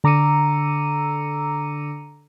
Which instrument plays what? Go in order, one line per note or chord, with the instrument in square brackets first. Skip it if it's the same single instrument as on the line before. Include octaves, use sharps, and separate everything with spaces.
[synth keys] D3 A#5 D6 E6 C#7 D#7